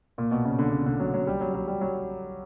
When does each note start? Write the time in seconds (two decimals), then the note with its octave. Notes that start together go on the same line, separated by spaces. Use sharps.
0.18 A#2
0.31 B2
0.45 C#3
0.59 D3
0.72 C#3
0.86 D3
1.00 F#3
1.14 F#3
1.27 G3
1.41 F#3
1.54 F#3
1.68 G3
1.81 F#3